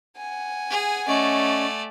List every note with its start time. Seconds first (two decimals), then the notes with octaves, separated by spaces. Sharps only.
0.17 F#5 G#5
0.70 G#4
1.08 A3 C#4 D5 D#5 C#6